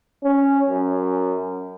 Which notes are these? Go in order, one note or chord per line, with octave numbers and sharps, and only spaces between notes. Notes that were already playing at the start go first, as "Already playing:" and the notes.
C#4
F#2